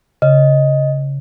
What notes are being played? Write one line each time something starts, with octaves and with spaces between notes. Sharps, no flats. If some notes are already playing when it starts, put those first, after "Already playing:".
C#3 D#5